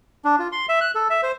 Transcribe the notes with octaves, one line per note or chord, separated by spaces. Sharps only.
D4
F4
C6
E5
F#6
A4
E5
C5